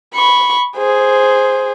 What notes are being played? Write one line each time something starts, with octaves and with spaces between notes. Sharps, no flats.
B5 C#6
G#4 C5